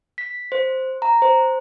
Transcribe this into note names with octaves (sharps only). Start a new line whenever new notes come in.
B6
C5
A#5
C5